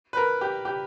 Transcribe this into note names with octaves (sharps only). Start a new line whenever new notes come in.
B4
A#4
G4
G4